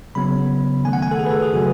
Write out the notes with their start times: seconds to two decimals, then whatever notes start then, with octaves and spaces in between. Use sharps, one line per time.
0.15 C#3 F#3 B3 B5
0.85 D#3 A3 G#5
0.93 F#5
1.02 G#5
1.11 A4
1.19 G#4
1.26 B4
1.31 A4
1.42 G#4
1.54 C#3 F#3 A3 F#4